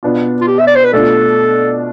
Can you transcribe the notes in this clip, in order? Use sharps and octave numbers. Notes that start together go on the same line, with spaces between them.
B2 B3 D4 F4
F4
G4
E5
D5
C5
B4
B2 A3 D4 F4 A4